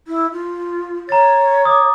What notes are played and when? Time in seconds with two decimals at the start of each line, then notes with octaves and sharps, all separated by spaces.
0.08 E4
0.33 F4
1.09 C#5 A#5 A6
1.65 D6 D#6